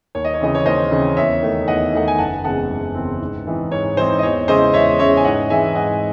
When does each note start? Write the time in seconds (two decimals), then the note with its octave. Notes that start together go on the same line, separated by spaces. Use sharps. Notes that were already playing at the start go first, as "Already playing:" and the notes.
0.15 D#2 C#5
0.25 D#5
0.34 C#5
0.40 C#3 E3 C4 D#5
0.55 C#5
0.66 D#2 C5 D#5
0.91 C#3 E3 C4
1.17 E2 C#5 E5
1.43 D#3 A3 D#4
1.68 E2 D#5 F#5
1.93 D#3 A3 D#4 F#5
2.08 G#5
2.18 F#1 F#5 A5
2.44 E2 C#3 G#3 C4 F#5 A5
2.70 F#1
2.95 E2 C#3 G#3 C4
3.21 G#2
3.47 E3 C4 D#4
3.72 G#2 C#5
3.97 E3 C4 D#4 C5
4.19 D#5
4.23 E2 C#5
4.48 C#3 G#3 C#4 E4 C5 D#5
4.74 E2 C#5 E5
4.99 C#3 G#3 C#4 E4 C#5 E5
5.17 G#5
5.24 G#2 D#5 F#5
5.50 E3 G#3 C4 D#4 E5 G#5
5.75 G#2 D#5 F#5